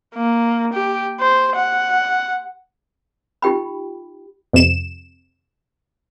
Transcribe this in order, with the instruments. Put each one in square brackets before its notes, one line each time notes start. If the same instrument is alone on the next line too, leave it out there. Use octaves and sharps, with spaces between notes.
[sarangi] A#3
G4
C5
F#5
[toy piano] D#4 F4 G4 G5 B5
[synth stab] F2 C3 E7